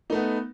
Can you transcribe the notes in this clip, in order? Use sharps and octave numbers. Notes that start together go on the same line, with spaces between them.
A3 B3 D#4